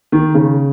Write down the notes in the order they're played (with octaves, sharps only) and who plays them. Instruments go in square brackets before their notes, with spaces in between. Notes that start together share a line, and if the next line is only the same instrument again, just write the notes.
[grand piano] D#3
C#3